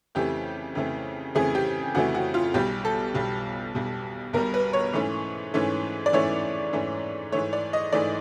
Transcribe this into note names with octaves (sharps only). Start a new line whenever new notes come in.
F2 C#3 E3 A3 G4
F2 C#3 E3 A3
F2 C#3 E3 A3 G#4
G4
F2 C#3 E3 A3 F#4
F#4
F4
B1 B2 G3 G4
A4
B1 B2 G3
B1 B2 G3
B1 B2 G3 A#4
B4
C#5
G#2 E3 A3 C#4
G#2 E3 A3 C#4
D5
G#2 E3 A3 C#4 C#5
G#2 E3 A3 C#4
G#2 E3 A3 C#5
D5
D#5
G#2 E3 A3 D5